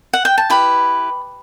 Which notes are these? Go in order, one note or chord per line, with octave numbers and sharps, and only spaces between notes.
F#5
G5
A5
E4 G4 B4 B5